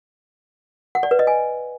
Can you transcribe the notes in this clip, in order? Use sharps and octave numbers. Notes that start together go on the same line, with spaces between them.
F#5
D5
B4
D#5
G#5